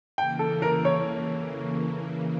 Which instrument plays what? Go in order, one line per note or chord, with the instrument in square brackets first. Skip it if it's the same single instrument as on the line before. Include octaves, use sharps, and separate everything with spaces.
[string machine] C#3 E3 A#3 [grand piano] G5
[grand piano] A4
A#4
C#5